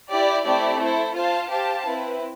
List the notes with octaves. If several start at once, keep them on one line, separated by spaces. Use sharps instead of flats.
E4 G4 D5
A3 C4 E4 G4 D5
E4 A4 C5
F4 C5 F5 A5
G4 C5 F5 A5
C4 E4 B4